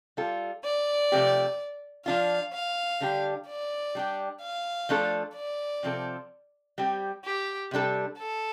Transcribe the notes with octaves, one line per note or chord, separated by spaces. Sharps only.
G3 F4 A4
D5
C3 F3 A3 C4 G4
F3 D4 F4 F5
F5
D3 G3 D4 G4
D5
G3 D4 G4
F5
F3 A3 D4 A4
D5
C3 F3 C4 A4
G3 C4 G4
G4
C3 G3 D4 A4
A4